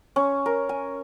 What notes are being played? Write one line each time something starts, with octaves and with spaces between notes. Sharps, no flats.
C#4
A#4
G#5